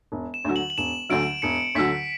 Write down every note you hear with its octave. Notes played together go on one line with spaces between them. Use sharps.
E1
E7
D2 D3 F#3
F#7
F#7
E1 E7
D2 D3 F#3 D7
E1 C#7
D2 D3 F#3 B6